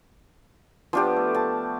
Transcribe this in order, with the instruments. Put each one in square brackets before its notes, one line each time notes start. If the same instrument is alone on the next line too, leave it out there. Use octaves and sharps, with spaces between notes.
[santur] F3 D4 G4 [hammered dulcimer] B3
[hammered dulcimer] A3
[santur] A5